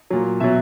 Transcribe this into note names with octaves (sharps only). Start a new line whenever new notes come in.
A#2 F#3
B2 F#3 E5